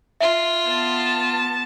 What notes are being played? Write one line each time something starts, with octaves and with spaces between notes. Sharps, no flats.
F4 E5
B3 A5